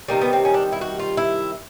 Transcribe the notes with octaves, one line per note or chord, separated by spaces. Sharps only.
C3 D#3 G3 A#3
B3
C4
C#4
D4
E4
F#4
F4
E4